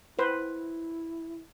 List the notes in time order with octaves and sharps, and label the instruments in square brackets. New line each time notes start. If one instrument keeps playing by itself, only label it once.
[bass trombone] E4 [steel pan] B4 C5